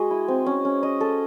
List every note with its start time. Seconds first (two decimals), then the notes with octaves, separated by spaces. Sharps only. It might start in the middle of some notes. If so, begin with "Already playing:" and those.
Already playing: G#3 F#4 G#4 D#5
0.11 E4
0.28 C4
0.46 C#4
0.65 C#4
0.83 D#5
1.00 A4